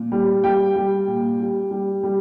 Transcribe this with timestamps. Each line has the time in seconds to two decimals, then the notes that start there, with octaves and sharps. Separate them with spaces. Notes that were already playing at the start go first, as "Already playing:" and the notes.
Already playing: A#2
0.12 G3
0.44 G3 G5
0.76 G3
1.07 A#2
1.40 G3
1.71 G3
2.03 G3